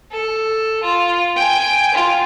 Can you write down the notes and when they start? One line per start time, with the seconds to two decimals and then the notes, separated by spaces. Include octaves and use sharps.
0.12 A4
0.82 F4
1.36 G5 G#5
1.93 F4